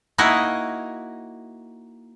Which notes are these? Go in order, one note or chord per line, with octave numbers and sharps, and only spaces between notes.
A#3 D#4 E4 F#4 D#5 G#5